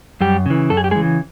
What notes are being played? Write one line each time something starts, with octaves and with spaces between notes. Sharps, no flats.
F#2 G3 G4
C#3 E3
F#2 A4
G#4
G4
G#3 G#4
C#3 E3